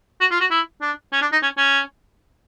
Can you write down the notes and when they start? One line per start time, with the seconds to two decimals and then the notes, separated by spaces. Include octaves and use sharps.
0.21 F#4
0.31 F4
0.41 F#4
0.51 E4
0.82 D4
1.12 C#4
1.21 D4
1.32 D#4
1.43 C#4
1.57 C#4